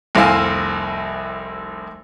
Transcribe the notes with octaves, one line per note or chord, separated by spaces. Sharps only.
F1 C2 C4 E4 F5 G#5